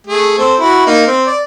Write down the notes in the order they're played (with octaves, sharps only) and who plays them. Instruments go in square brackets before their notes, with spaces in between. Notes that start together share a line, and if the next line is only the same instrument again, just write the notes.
[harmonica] A3 G#4
C4 A4 C5
E4 F#4
A#3 D#4
C4
D5